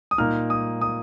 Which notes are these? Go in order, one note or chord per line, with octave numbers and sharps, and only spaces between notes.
D#6
A#2 A#3 D#4 F6
D#6
D#6